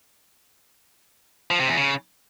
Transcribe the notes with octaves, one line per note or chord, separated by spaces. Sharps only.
F3
C3
E2
C#3